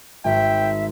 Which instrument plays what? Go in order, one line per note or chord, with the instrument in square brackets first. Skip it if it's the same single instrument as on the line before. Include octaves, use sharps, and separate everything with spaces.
[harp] G#1 [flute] E5 [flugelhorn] G5